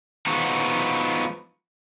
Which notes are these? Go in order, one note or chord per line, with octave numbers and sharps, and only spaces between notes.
F3 G#3 B3 D#4 F#4